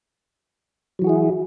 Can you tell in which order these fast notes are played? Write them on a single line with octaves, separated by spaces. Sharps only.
F#3 E3 F#4 G#4 E4